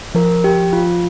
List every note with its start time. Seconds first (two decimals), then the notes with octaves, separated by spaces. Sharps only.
0.15 F3 A#4
0.44 G4
0.73 F4